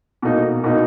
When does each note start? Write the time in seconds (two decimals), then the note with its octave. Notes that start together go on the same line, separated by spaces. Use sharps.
0.22 B2 A#3 D#4
0.64 B2 A#3 D#4